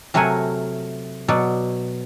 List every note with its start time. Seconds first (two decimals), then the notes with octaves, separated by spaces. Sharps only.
0.14 C3 F#3 A3 A#4 F#5 G#5
1.28 B2 F#3 D5